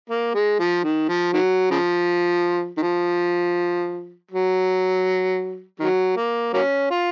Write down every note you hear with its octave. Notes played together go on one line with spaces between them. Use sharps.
A#3
G#3
F3
D#3
F3
D#3 F#3
C#3 F3
D#3
F3
F#3
D#3 F#3
A#3
F#3 A#3 C#4
F4